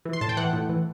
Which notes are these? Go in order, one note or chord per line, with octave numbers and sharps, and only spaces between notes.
E3
C6
A2 A5
G5
E3 F#5
A2
E3